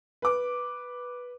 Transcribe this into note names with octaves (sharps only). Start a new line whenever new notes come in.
B4 D6